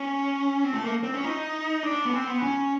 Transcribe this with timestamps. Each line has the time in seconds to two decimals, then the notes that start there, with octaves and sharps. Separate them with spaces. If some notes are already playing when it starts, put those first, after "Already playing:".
Already playing: C#4
0.64 C4
0.74 A3
0.84 A#3
1.03 C4
1.14 C#4
1.24 D#4
1.83 D4
2.05 B3
2.13 C4
2.27 B3
2.43 C#4